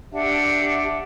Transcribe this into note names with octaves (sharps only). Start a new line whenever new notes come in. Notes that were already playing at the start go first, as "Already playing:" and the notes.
D4 G4 E5 F#5